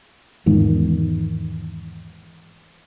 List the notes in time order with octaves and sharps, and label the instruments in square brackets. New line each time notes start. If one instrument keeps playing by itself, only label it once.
[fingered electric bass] E2 G#2 D#3